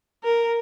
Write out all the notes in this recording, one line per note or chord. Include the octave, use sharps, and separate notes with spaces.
A#4